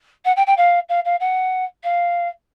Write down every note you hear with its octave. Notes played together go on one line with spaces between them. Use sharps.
F#5
G5
G5
F5
F5
F5
F#5
F5